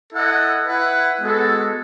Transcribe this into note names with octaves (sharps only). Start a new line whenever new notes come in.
E4 A4 D#5 F#5
E4 B4 F#5
G#3 B3 F#4 A4